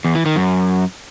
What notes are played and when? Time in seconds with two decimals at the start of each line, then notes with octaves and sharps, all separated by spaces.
0.05 E2
0.15 E3
0.26 D#3
0.36 F#2